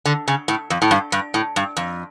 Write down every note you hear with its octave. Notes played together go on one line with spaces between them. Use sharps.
D3
C#3
A2
F2
A2
G2
G2
A2
G2
F2